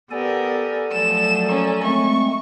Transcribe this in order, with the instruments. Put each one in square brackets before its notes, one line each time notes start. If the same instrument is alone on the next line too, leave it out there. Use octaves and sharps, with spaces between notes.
[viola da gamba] B3 G4 A#4 [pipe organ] A4 D5 G#5
[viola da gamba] F3 F#3 A3 [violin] E7
[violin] A#3 C#4
[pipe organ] G#3 A3 C4 [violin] C#6